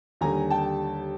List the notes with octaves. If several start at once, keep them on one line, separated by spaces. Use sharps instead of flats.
D#2 D3 G3 G#5 A#5
G5 A5